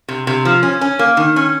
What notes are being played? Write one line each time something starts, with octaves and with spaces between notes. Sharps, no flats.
C3
C3
F3
C#4
C#4
A#3
D#3
C#4